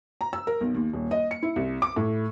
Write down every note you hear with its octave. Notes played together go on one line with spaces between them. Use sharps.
A#5
E6
A#4
B1
D#2
D#1
D#5
C#7
E4
C2
D6
A2